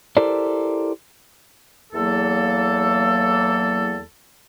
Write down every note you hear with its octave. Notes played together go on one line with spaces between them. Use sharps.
E4 G4 A4 A#4 C5 D5
E2 F#3 A#3 A4